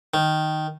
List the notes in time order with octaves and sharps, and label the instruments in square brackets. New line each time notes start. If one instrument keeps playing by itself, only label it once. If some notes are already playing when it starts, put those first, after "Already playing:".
[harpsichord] D#3